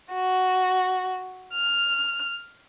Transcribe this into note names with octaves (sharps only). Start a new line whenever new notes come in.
F#4
F6